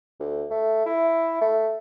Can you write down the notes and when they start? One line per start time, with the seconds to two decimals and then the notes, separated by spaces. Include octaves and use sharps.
0.20 D2
0.51 A3
0.86 E4
1.41 A3